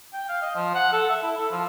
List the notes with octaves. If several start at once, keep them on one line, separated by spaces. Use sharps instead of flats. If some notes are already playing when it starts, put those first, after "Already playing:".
G5
F5
D#5
F3
F#5
A4
E5
E4
A4
F3